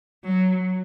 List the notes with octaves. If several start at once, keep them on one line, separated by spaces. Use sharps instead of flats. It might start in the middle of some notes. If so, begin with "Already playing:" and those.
F#3